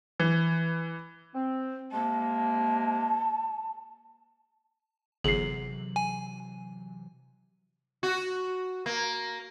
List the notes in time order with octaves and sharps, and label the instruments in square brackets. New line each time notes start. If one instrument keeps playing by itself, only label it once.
[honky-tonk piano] E3
[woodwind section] C4
[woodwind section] C3 G#3 A#3 [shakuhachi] A5
[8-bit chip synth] G1 [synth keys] C3 E3 F#3 [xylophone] G#4 [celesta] C7 F#7
[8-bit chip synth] G#5
[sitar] F#4
A#3